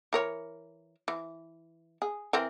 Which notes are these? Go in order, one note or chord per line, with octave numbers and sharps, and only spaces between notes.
E3 A#4 C#5
E3
G#4
E3 C4 A#4